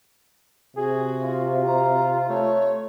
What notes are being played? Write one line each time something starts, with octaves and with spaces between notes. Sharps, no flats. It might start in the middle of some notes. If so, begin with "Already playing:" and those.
C3 F#4 G#4
F4
A#5
A3 C#5